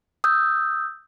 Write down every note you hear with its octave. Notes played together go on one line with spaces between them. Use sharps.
D#6 E6 G6